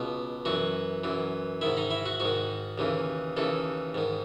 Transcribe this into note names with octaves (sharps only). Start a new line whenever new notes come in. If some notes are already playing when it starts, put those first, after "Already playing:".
Already playing: C#2 B2
F#2 E3 F#4
F#2 E3
G#2 D#3 E4
D#4
E4
F#4
G#2 D#3 F#4
D#2 C#3 E3
D#2 C#3 E3 A4
G#2 D#3